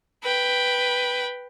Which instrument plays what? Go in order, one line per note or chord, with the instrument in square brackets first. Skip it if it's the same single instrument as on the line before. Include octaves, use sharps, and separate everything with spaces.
[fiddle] B4 G5